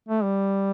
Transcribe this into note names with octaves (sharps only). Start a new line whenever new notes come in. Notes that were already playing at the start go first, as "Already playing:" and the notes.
A3
G3